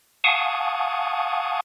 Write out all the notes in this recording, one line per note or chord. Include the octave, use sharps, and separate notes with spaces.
F5 F#5 G#5 A5 C#6 D#6